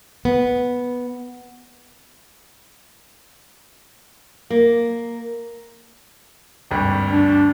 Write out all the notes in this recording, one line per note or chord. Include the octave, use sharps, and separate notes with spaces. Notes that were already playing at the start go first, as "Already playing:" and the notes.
B3
A#3
G#1 D2 G2
D4